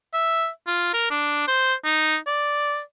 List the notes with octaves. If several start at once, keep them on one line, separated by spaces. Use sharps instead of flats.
E5
F4
A#4
D4
C5
D#4
D5